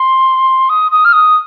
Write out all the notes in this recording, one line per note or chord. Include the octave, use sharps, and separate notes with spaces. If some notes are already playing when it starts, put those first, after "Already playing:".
Already playing: C6
D#6
D#6
F6
D#6